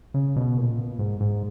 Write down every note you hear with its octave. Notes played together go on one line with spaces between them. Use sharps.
C#3
B2
A#2
G#2
G#2